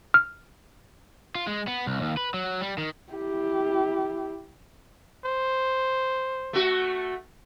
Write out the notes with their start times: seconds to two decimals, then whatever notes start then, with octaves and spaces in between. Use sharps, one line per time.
0.14 F6
1.35 F4
1.47 G#3
1.67 B3
1.87 C2
2.01 D#2
2.17 B4
2.34 F#3
2.61 G3
2.78 D#3
3.13 E4 G4
5.25 C5
6.53 A3 F#4